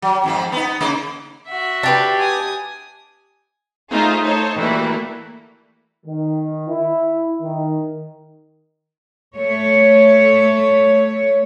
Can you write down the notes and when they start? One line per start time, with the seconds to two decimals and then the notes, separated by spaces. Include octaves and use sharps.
0.02 F#3
0.24 F2 G#2 F3
0.52 B3 D#4
0.80 C#3 A#3 D#4
1.48 F#4 E5
1.83 D4 G4 B4
2.19 G#5 D#6
3.90 A3 D#4 F4 G#4 C5
4.24 D#4 A4 C5 C#5
4.56 E3 G3 A3 A#3 E4 F#4
6.06 D#3
6.69 E4
7.42 D#3
9.36 A3 C#5